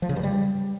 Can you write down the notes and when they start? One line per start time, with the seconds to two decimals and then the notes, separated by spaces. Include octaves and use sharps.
0.02 F3
0.09 C#3
0.16 G2
0.23 G3